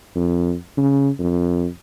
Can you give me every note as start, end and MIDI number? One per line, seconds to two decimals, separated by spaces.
0.16 0.54 41
0.77 1.09 49
1.19 1.66 41